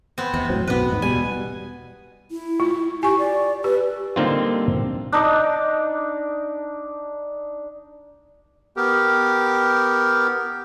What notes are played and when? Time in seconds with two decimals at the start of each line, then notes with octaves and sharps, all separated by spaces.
0.18 B3 C4
0.34 E2 C3
0.49 A2 F#3 C4
0.67 B1 F#2 B2 B3 B4
0.90 E2 G#2
1.02 B2 G3 G#5
2.31 E4
2.60 F4
3.03 G4 G#5 C#6
3.19 D5
3.64 G4 B4
4.16 D3 G3 A#3 C4 D#4 F4
5.12 D4 D#4 D5
8.77 B3 G4 A#4